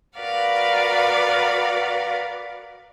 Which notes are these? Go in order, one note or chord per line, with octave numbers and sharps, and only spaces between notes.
F#4 A#4 B4 D5 F5 F#5